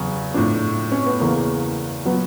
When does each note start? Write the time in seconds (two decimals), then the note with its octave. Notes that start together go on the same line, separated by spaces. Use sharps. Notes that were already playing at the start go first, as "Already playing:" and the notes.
Already playing: E2 C#3 F#3
0.34 A2 F3 D4
0.92 C#4
1.06 B3
1.20 E2 C#3 E3 A#3
2.05 A#2 F#3 B3